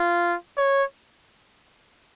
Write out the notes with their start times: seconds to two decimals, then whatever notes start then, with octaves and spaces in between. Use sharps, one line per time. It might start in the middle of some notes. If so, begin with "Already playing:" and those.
Already playing: F4
0.57 C#5